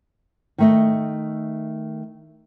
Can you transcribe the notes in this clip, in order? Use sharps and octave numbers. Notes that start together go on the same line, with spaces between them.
D#3 A3 D#5